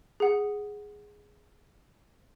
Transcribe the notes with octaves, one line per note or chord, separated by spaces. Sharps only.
G#4 F#5